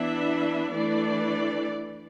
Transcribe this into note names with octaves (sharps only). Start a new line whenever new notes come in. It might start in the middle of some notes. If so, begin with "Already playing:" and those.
Already playing: E3 B3 D4 E5
E3 A3 D4 D5